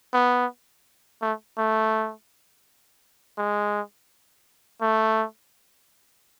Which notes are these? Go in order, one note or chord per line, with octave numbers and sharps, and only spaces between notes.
B3
A3
A3
G#3
A3